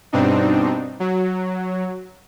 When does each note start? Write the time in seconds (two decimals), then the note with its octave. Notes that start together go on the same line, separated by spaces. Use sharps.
0.12 G2 B2 C4 D4 D#4
1.00 F#3